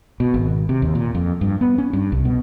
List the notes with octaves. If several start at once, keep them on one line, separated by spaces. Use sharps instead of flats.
B2
G#1
C3
D#2
A#2
F2
G2
B3
C#4
G2
C2
B2